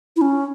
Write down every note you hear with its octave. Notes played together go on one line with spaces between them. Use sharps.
E4
C#4